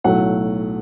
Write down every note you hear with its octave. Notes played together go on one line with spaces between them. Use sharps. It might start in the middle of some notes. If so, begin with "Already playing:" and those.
B1 A2 F#3 A3 F#5